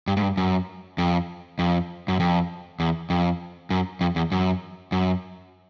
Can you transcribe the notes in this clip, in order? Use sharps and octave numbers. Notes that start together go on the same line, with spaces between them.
G2
G#2
G2
F#2
F2
F2
F#2
F2
E2
F2
F#2
F2
E2
F#2
F#2